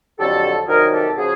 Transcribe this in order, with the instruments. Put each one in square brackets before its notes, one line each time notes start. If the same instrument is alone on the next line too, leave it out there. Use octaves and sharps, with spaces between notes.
[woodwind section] F2 D3 F#3 G4 A4
C2 C3 D#3 F#3 G#4 A#4
G4 A4
C#3 F3 F#4 G#4